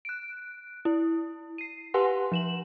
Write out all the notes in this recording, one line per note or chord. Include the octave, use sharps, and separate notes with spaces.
F#6 D7
E4
C7 D#7
G4 B4 F#5 G#5 C6
F3 E7 F#7